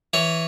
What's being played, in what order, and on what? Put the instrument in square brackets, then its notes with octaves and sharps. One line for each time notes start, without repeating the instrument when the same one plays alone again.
[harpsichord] E3 C#5